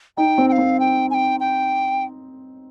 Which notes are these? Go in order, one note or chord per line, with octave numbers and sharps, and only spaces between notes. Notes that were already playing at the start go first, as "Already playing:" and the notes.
D#4 G5
C4
G5
F5
C4
G5
G#5
G5
G5